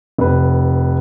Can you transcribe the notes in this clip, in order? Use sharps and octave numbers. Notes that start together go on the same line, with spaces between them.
F1 B4